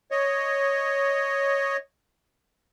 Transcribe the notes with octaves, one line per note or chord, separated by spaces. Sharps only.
C#5 D#5